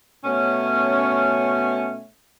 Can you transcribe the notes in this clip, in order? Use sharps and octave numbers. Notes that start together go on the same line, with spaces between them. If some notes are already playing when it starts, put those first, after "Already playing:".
B2 A3 C#4